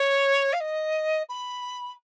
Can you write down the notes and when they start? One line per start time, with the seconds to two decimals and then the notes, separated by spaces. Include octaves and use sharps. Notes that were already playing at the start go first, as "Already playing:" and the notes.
Already playing: C#5
0.53 F5
0.60 D#5
1.29 B5